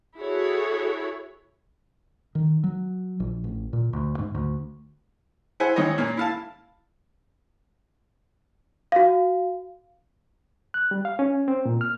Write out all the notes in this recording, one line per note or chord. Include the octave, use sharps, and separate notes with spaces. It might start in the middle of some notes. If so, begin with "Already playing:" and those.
E4 F#4 G#4 A4 C#5
D#3
F#3
A#1
A1
A#2
D2
G#2
D2
E4 G#4 C5 E5 F#5 G#5
D#3 E3 C4 C#5 D#5
A#2 A#3 C#4
E4 F5 A5
F#4 F5
F#6
G3
F5
C#4
C4
A#2
F6